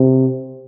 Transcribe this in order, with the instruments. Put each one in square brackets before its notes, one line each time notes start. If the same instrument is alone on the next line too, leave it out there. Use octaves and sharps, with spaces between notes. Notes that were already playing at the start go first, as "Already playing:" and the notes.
Already playing: [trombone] C3